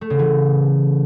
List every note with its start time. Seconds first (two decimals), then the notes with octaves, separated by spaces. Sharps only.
0.01 A3
0.10 C#3
0.19 E3